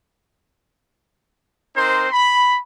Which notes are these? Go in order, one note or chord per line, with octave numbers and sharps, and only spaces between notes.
C4 D#4 A#4 C5 C6
B5